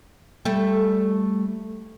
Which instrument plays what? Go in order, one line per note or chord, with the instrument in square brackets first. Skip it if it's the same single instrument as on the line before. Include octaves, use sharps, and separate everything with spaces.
[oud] G3 A3